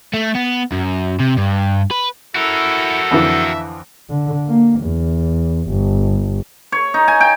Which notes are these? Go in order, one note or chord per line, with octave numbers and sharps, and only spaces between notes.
A3
B3
F#2
C3
G2
B4
E4 F#4 A4 A#4
F2 D3 E3 E5
D3
A#3
E2
G1
C#5
D#4
G#5
G5